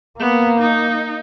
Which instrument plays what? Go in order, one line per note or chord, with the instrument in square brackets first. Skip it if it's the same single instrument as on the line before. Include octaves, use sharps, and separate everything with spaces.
[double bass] A#3 [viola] B3
[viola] D#4